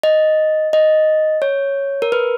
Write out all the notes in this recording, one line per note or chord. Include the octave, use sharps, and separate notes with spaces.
D#5
D#5
C#5
A#4
B4